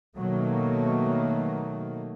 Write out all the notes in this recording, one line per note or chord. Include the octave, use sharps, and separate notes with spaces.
B2 D#3 F#3 A3 A#3